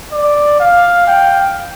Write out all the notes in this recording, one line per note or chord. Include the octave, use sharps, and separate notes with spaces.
D5
F5
G5